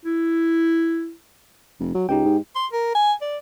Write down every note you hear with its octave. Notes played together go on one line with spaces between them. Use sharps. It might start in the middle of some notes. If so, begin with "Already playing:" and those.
E4
F1
F#3
C#2 D#4 G4 G5
G#2
C6
A#4
G#5
D5